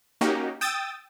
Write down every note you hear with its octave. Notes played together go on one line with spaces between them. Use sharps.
A#3 C#4 D#4 F#4 G4
G5 D#6 E6 A6